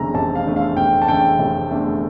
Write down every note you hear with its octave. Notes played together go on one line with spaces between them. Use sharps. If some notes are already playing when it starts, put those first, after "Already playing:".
Already playing: F1 E2 D3 A3 A#5
F1 A5
F5
E2 D3 A3
F5
F1 G5
A5
E2 D3 A3 G5
F1
E2 D3 A3